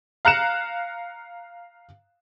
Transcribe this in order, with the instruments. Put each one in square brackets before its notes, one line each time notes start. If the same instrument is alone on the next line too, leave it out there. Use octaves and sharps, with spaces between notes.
[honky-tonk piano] F5 A#5 F#6 C#7 E7